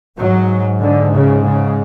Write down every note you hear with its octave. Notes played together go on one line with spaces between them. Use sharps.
G#2 F#3
D3
C#3
C#3